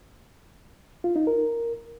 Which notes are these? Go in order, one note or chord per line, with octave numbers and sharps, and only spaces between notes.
F4
D#4
A#4